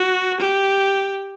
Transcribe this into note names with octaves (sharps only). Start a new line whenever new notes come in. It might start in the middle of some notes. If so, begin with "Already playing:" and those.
Already playing: F#4
G4